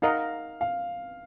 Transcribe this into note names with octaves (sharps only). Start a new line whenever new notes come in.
D#4 A#4 D#5 F5 F#5
F5